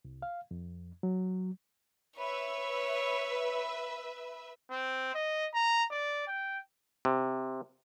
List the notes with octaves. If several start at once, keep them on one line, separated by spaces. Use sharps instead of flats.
C2
F5
F2
F#3
B4 C#5 E5
C4
D#5
A#5
D5
G5
C3